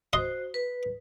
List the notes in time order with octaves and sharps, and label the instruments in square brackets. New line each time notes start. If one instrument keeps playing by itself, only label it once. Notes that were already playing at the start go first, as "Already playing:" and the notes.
[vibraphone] F#4 C5 [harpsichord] D#5 C6
[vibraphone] B4